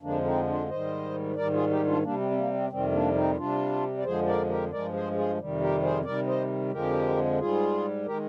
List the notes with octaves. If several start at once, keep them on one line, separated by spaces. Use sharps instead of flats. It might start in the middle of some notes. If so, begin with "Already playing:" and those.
F2 D3 F3 G#3 A#3 D4
C4 D#4
D4 F4
G#2 D#3 G3 C5 D#5
G#2 D#3 G3 A#4 D5
F4 G#4
D#4 G4
D4 F4
C3 G3 A#3 D4
C4
C4
A#3
C4
F2 C3 D#3 G3 C4
A#3 D4
C4 D#4
C3 G3 D4 F4
D5
F2 D3 F3 G#3 G#4 C5
A#4 D5
G4 A#4
G2 F3 G#3 A#4 D5
G#4 C5
F4 G#4
F2 C3 D#3 G3
G4 A#4
G#4 C5
C3 D#3 G3 A#4 D5
C5 D#5
F2 D3 F3 G#3 G4 A#4
G#2 G3 F4 G#4
D#3 G#3 G4 A#4